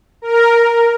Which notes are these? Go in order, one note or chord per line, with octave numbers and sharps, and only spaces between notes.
A#4